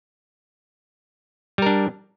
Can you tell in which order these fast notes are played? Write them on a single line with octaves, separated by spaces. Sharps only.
G3 A#4 D4